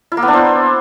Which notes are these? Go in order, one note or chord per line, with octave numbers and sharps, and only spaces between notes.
E4
A#3
B3
D4
C5